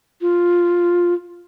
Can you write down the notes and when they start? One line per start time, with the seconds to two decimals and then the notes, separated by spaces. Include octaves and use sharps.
0.21 F4